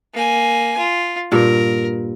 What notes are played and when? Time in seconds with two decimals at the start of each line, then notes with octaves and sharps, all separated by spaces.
0.14 A#3 G#5
0.78 F4
1.32 G2 A#2 A#4